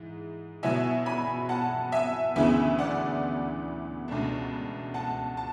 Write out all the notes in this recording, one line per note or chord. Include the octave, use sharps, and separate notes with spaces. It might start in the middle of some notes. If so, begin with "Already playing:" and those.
Already playing: G#2 E3
B2 F#3 B3 E4 E5 G#5
G#5 B5
F#5 A5
E5 G#5
D2 C#3 E3 B3 E5 G#5
D5 F#5
C#2 B2 A3 D4
F#5 A5
A5